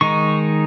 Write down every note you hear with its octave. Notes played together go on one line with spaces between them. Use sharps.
D#3 G#3 D#4 C#6